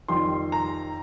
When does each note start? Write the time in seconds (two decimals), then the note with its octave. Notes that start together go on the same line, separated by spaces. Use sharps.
0.08 F2 D#3 G3 C6
0.52 A#5